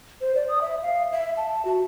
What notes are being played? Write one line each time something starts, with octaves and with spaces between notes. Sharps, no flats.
C5
D5
D#6
E5
F5
E5
A5
F#4